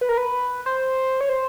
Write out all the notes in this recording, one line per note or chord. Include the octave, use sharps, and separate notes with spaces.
B4
A#4
B4
C5
C#5
C5